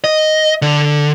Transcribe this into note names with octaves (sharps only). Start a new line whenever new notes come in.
D#5
D3